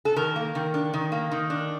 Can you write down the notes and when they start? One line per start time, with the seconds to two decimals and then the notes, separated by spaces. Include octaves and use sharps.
0.05 A4
0.16 D#3 A#4
0.36 A#3
0.55 D#3
0.74 D4
0.93 D#3
1.12 A#3
1.32 D#3
1.50 D4